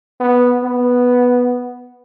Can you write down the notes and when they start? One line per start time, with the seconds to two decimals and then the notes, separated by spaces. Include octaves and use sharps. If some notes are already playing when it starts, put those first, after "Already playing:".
0.21 B3
0.64 B3